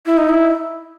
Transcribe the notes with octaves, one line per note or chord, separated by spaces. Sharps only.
E4
D#4
E4